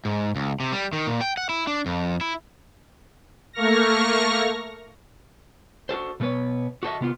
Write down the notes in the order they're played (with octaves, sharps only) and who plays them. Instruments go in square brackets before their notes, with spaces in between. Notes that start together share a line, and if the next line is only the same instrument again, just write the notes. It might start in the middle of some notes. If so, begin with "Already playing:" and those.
[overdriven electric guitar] G#2
C#2
C3
G3
D#3
A#2
G5
F#5
E4
D4
F2
E4
[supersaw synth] A3 A#3 C#6 F6 A#6
[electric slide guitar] F#4 G#4 A4 C5
B2 A3 B3 B4 C#5
F#4 G4 A4 C5 D#5 E5
C3 B3 F4